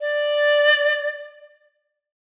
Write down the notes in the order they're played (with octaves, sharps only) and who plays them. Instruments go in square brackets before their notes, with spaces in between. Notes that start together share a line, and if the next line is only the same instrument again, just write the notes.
[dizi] D5